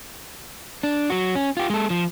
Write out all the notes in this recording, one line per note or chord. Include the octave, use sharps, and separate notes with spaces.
D4
F#3 F#4
C#4
F4 G4
G#3 A4
F3